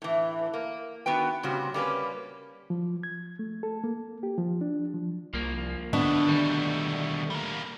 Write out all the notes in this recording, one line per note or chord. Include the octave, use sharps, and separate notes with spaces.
A2 E3
A#3
D#3 B3 F#4 B4 G5
A#2 C#3 G3 C4 F#4
G3 A#3 C#4 B4
F3
G#6
A3
A4
A#3
G4
F3
D4
F3
C2 F3 A#3
B2 D3 A3 B3 D4
D2 D#3 G3
G3 A#3